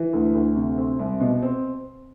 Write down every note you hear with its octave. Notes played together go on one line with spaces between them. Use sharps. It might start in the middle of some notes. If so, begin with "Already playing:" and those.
Already playing: E3
D2
D2
C3
C4
C2
B2
C4